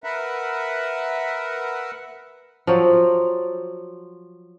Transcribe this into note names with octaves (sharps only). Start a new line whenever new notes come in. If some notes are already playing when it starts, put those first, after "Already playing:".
A#4 B4 E5 F#5
F3 F#3